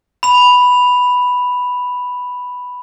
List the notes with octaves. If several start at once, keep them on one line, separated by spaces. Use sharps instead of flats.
B5 F7